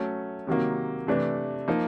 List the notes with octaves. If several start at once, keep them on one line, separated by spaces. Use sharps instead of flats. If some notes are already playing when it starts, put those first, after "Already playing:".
Already playing: F#3 A3 C#4
C3 D#3 F#3 A#3
C3 E3 A3 D4
F3 A#3 D#4